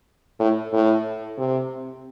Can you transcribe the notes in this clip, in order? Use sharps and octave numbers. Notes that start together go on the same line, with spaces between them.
A2
A2
C3